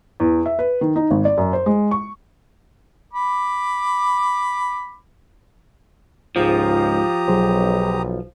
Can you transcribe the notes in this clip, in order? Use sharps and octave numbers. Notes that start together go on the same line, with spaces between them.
E2
E5
B4
D#3
D#4
G#1
D5
F#2
C5
G#3
C#6
B5 D6
C#2 G#2 F3 G4 A#5 D#6
B1 F#3 G#4 C5